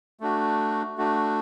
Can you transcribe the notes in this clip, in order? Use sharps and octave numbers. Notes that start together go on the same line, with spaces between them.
A3 D4 F#4
A3 D4 F#4